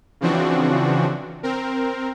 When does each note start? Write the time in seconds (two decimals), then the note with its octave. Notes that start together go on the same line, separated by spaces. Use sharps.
0.21 C#3 E3 F3 C4 D4 F#4
1.43 C4 A#4